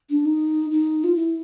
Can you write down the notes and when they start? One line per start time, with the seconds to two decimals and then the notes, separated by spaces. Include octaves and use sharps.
0.10 D4
0.25 D#4
0.71 D#4
1.04 F4
1.15 E4